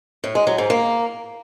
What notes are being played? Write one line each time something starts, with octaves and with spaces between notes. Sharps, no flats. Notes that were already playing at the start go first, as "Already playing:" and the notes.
A2
G#3
F#3
G#2
A#3